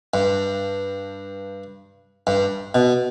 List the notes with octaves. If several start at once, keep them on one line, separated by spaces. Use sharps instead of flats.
G2
G2
B2